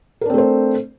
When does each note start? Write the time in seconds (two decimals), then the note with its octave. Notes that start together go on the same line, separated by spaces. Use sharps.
0.21 A#4
0.26 D4
0.30 C4
0.34 A3
0.38 C5